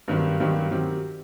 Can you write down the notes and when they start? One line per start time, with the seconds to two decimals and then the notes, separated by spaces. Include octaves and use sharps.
0.08 G2 D#3 F#3 C4 G4
0.40 G2 D#3 F#3 C4 G4
0.71 D#3 F#3 C4 G4